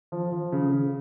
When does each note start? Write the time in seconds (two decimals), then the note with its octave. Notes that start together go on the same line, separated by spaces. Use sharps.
0.12 F3
0.32 F3
0.52 C#3
0.72 C#3